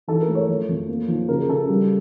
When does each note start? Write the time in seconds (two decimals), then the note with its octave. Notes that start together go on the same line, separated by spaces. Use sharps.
0.08 E3 A4
0.22 A#4
0.28 A3
0.35 C#5
0.48 F3
0.69 F2
0.88 A#3
1.08 F3
1.29 C#3 A#4
1.49 C#3 A4
1.69 G3